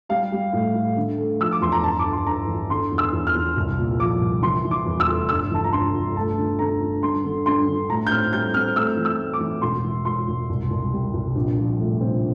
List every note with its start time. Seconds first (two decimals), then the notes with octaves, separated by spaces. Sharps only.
0.09 G3 F5
0.32 G3
0.53 A2
0.75 A2
0.97 D3
1.18 A3
1.40 F3 E6
1.52 D6
1.61 E2 C6
1.72 A#5
1.83 G1 A5
1.99 D6
2.05 G1
2.12 C6
2.26 G1 A#5
2.47 E3
2.69 D3 C6
2.91 E2
2.98 E6
3.13 E2
3.27 F6
3.35 E2
3.57 C2
3.78 A#2
4.00 F3 D6
4.21 C2
4.42 E3 C6
4.65 E3
4.71 D6
4.86 E2
5.00 E6
5.07 F1
5.29 G1 E6
5.51 E3 A5
5.64 A#5
5.72 G2 C6
5.94 G1
6.16 A3 A5
6.38 D3
6.59 D3 A#5
6.81 D3
7.02 G2 C6
7.24 D3
7.46 G2 C6
7.67 D3
7.89 A2 A#5
8.07 G6
8.11 C4 F6
8.33 G3 G6
8.54 C4 F6
8.76 A3 E6
8.97 E3
9.05 E6
9.18 A3
9.33 D6
9.40 E3
9.62 E1 C6
9.84 E3
10.05 E1 C6
10.28 E1
10.49 C2
10.70 C2
10.93 G3
11.13 C2
11.35 A#1
11.58 F3
11.78 A2
12.01 C4